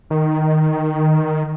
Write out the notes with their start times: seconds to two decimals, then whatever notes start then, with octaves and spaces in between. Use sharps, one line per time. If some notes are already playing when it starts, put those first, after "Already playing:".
0.10 D#3